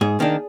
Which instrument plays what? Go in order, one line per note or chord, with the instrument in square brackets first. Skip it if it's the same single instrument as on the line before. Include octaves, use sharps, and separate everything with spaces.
[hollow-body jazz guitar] G#2 G#4
D#3 A#3 D4